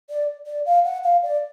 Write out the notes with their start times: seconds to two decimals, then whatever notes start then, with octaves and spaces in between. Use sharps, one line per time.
0.10 D5
0.47 D5
0.66 F5
0.85 F#5
1.04 F5
1.23 D5